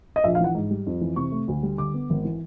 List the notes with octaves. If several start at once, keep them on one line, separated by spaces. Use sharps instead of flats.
D#5
A#1 E5
F5
E3 F#5
G#2
G3
F2
E3
C3 C#6
A3
D2
G3
D3 D6
B3
G#1
E3